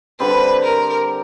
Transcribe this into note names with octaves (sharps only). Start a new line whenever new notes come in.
D3 G3 C4 B4
A#4